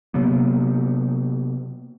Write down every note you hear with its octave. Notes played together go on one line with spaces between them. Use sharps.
C3 F#3 A#3 B3